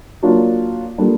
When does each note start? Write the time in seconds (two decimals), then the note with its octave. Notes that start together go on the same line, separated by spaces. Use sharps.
0.23 F#3 A#3 D4 F4
0.98 G3 A#3 D4 F4 A4